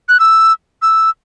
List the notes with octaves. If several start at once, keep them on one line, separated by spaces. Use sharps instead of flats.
F#6
E6
E6